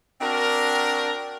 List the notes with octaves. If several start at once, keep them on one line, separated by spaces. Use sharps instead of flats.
C4 D4 F#4 A#4